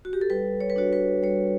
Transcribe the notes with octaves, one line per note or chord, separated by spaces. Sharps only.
F#4
G4
A4
G3 B4
C#5
B4
D4 F#4 C#5
B4
G3 C#5